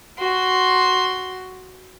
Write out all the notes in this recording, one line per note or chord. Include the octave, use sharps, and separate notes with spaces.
F#4 C6